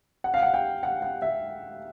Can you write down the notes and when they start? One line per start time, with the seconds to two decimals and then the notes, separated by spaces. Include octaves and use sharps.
0.24 F#5
0.34 F5
0.42 F#5
0.54 G5
0.83 F#5
1.02 F#5
1.22 E5